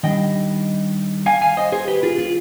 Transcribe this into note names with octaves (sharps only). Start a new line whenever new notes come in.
D#3 G3 D4 D#5 G5
F5 G#5
F5 G#5
C5 D#5
G#4 C5
G4 B4
F4 G#4
F4 G#4